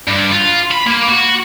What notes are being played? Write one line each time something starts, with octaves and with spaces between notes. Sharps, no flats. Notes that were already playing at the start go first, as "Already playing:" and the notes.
G2
F4
B5
A#3
F#4